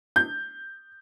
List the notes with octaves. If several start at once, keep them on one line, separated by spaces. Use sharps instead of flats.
G6